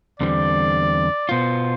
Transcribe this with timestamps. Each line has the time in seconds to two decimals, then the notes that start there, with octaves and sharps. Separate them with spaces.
0.20 E2 D3 G3 C4 D5
1.29 B2 B3 F4 C5